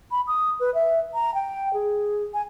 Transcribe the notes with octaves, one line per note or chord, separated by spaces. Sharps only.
B5
D#6
B4
E5
A#5
G5
G#4
G#5